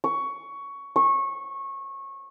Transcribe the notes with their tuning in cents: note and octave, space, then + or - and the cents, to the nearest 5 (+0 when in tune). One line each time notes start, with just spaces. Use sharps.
C#6 +15
C#6 -20